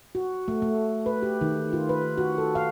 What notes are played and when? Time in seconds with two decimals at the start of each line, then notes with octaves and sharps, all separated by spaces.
0.15 F#4
0.48 A3
0.62 A3
1.06 B4
1.22 G4
1.41 D#3
1.73 F4
1.89 B4
2.18 F#4
2.38 A4
2.55 F5